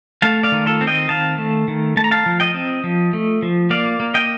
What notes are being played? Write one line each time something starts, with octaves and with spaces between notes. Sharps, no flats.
A3 F5 A5
D5 F5
D#3
F4 A4
C4
D#5 G5
D#3 F5 A5
A3
D#3
A3 A5
A#5
F5 A5
F3
D#5 G5
C4
F3
A3
F3
A#3 D5 F5
A#3
D#5 G5